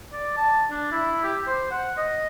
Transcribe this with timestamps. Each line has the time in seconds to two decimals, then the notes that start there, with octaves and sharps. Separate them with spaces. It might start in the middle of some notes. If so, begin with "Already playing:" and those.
0.13 D5
0.37 A5
0.71 D4
0.92 E4
1.24 G4
1.47 C5
1.71 F#5
1.97 D#5